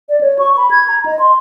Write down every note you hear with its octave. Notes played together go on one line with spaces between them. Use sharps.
D5
C#5
C#6
B5
G#6
A#5
D#5
C6